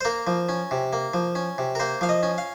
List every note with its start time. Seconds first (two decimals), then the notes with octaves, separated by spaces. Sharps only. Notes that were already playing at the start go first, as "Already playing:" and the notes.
0.01 C5
0.05 A#3 A#4
0.27 F3
0.49 C#4
0.71 C3
0.93 A#3
1.14 F3
1.35 C#4
1.58 C3
1.75 A#4
1.80 A#3 C5
2.01 F3 F5
2.09 D#5
2.23 C#4
2.38 F5